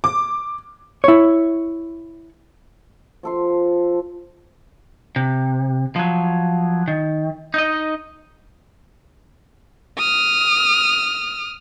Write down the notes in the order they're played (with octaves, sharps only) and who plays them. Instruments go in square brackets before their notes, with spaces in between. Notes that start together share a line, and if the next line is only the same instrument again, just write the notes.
[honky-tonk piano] D6
[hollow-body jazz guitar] E4 C#5
[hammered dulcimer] F3 A4 C6
[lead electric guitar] C3
F3 F#3
D#3
D#4 D#5
[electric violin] D#6 F6